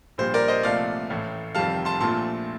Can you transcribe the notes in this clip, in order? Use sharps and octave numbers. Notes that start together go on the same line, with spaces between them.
A#1 A#2 G3 C5
A#4 D5
C5 D#5
C2 A#2 F3 A3 D5 F5
A1 A2 A3
F1 F2 D#3 G3 F5 A5
A5 C6
A#1 A#2 F3 A3 A5 C6